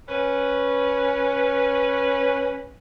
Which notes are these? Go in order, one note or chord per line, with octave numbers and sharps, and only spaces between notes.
C#4 B4